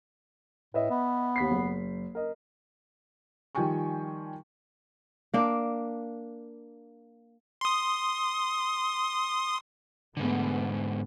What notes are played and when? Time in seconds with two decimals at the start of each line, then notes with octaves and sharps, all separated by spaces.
0.74 A2 B4 D#5 E5
0.90 B3
1.36 D#2 B6 C7
1.51 F#1
2.15 A#4 D#5
3.55 D#3 F3 G3 G5 G#5 C#6
5.34 A#3 D4
7.61 C6 D#6
10.17 G#2 D3 A3 B3